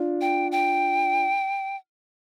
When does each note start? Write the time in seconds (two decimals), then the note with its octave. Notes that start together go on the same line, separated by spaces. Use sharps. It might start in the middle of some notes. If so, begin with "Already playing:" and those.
Already playing: D4 F4
0.21 G5
0.52 G5